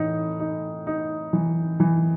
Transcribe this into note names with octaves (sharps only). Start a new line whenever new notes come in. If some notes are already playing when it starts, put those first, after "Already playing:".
Already playing: A2 E3 D#4
D#4
D#4
E3
E3